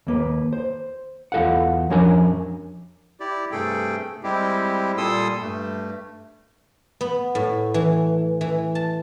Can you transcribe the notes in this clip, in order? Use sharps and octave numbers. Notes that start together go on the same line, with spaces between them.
D#2 A#3 B4
C5
E2 F4 A4 F5 F#5
F2 F3 C#4 D4 A#4 G#5
E4 G4 D5
G2 C3 A3 G#4 A4 G5
G3 G#3 C4 E4 G4
A#2 G3 A4 C6 D#6 E6
G2 A3
B3
A2
E3
E3
A5